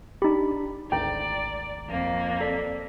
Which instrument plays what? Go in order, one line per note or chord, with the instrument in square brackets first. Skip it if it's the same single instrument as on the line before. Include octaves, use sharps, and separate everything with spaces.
[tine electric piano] D4 B5 [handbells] D#4 G4
[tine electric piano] G#1 D2 A#5 [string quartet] D5 [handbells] G5
[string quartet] F2 A#3
[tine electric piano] A4 D5 B6